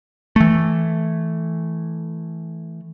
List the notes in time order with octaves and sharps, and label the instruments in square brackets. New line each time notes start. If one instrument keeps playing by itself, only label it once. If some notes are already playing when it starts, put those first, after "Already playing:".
[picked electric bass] E3 A3